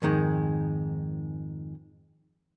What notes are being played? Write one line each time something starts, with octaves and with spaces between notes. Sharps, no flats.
F2 G#2 D#3 G#3